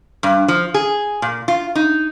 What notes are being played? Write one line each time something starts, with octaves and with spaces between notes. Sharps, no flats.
G2
F3
G#4
A#2
F4
D#4